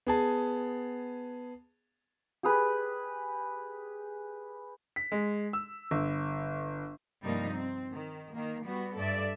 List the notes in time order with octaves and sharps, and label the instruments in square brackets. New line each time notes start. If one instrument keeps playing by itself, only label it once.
[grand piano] B3 G#4 A5
[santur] G4 G#4 B4
[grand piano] B6
G#3
E6
G1
[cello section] G2 C3 F3 G3 A#3 D#4
C4
D#3
D#3 A#3
G3 B3 F#4
G2 A4 D5 E5